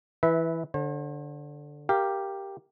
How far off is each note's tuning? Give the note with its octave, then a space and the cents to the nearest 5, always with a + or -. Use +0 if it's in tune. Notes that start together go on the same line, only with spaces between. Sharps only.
E3 +0 B4 +0 E5 -20
D3 +0 C5 +45
G4 +0 A#4 +0 F5 -20